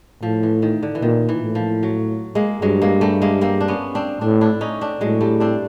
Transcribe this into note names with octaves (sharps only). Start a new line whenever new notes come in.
A2 F3
E3
D#3
D3
E3
A#2 D#3
E3
A2
F3
F#3
G#3 A#3
G2 F#3 G#3
G#3 A#3
G3 A3
G#3 A#3
A#3 C4
D4
B3 C#4
C4 D4
A2 C4 D4
D4 E4
C#4 D#4
C4 D4
A2 F#3 G#3
G3 A3
C4 D4